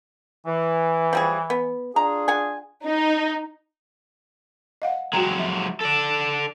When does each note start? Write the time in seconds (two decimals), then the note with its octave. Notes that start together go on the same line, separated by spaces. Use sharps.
0.46 E3
1.13 F3 G3 G#4
1.50 B3
1.96 D4 F4 G#4 A#5
2.28 F#5 G#5
2.84 D#4
4.82 D#5 F5 F#5
5.13 F#3 G#3 F#4 G5 A#5
5.38 F3 E5
5.81 A4 D5